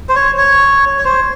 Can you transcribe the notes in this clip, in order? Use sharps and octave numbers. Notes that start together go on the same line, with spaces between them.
C5
C#5
C#5
C#5
C5